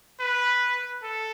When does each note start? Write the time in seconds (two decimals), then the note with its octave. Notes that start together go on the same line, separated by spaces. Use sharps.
0.20 B4
1.03 A4